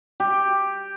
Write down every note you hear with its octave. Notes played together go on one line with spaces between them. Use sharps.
G4